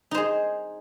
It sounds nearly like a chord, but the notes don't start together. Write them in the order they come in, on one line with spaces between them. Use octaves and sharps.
D#4 C5 G#4